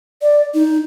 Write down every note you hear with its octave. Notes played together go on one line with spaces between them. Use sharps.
D5
D#4